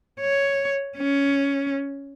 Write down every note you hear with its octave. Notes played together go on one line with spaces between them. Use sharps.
C#5
C#4